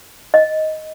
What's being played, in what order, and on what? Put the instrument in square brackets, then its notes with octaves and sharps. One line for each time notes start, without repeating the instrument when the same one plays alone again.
[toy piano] D#5